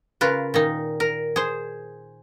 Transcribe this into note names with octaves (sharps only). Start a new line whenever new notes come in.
C#3 F4 A#4 B4
A#2 D#3 D#4
A#4
G#4 C5